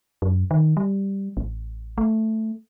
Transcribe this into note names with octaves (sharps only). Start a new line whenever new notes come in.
F#2
D#3
G3
A1
A3